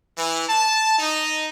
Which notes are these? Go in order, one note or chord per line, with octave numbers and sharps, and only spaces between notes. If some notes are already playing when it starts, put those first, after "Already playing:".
E3
A5
D#4